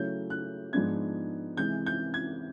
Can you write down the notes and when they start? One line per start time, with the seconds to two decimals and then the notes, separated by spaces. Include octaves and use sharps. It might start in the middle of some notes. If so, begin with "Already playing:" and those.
Already playing: C#3 F#3 A3 C#4 E4 G6
0.30 F#6
0.73 G#2 F3 G#3 B3 D4 G#6
1.57 C3 E3 G#3 G6
1.86 G6
2.14 G#6